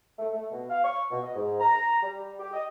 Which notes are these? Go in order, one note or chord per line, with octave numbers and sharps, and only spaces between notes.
A3
A3
B2
F5
C#6
B2
D#5
G#2
A#5
G3
G4
D#5